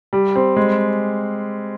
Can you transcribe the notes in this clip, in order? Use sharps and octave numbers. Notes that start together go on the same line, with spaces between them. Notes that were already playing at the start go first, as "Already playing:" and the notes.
G3
C4
G#3